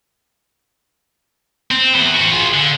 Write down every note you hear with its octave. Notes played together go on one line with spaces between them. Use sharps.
C4
E3 B3
C4 F#4
F4 G#4
D3